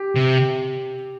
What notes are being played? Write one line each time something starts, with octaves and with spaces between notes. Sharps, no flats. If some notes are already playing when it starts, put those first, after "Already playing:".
Already playing: G4
C3